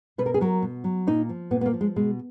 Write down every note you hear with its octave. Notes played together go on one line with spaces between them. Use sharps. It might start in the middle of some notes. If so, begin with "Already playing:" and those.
B2 B4
A#4
G#4
F#3 A#4
B2
F#3
A#2 D#4
F3
A#2 B3
B3
A#3
F3
G#3
B2 G#3